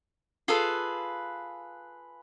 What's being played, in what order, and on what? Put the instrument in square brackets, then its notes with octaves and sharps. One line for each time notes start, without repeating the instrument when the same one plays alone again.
[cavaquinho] F4 G#4 A4 B4